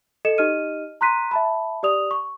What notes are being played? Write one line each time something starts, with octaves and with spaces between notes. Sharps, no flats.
A4 D#5 C#7 E7
D#4 G4 D#5 F6 D#7
A#5 C6 F#6 B6 D#7
E5 A5 B5
G4 D5 D#6 F7
C#6